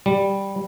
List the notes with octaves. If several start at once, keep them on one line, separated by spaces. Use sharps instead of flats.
G3